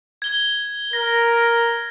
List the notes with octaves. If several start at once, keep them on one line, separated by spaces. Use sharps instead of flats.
G#6 G7
A#4 A#6